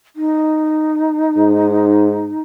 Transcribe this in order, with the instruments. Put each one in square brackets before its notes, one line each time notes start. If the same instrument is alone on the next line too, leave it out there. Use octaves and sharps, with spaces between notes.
[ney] D#4
[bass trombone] G#2